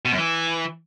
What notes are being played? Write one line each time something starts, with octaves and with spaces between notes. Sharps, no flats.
B2
F#2
E3